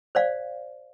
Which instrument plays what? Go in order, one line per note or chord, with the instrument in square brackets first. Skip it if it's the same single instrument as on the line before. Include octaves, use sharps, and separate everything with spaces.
[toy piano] C5 D5 F5